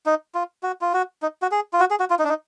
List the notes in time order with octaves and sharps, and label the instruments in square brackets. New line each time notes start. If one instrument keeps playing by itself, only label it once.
[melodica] D#4
F4
F#4
F4
F#4
D#4
F#4
G#4
F4
F#4
G#4
F#4
F4
D#4
D4
D#4